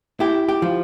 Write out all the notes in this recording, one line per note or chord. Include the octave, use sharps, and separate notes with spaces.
E4 G4
G4
F3